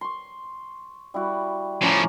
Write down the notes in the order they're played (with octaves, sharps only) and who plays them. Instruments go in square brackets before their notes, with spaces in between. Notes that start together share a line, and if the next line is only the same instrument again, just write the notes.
[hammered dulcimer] C6 C#6
G3 E4 F#4
[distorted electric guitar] A2 F3 [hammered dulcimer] C#4 D5 A#5